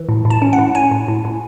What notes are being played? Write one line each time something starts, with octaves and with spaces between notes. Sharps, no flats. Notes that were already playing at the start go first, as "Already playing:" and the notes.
Already playing: E3
A2
A2
A5
C#4
F#5
A2
C#4 G#5
A2
A2
A2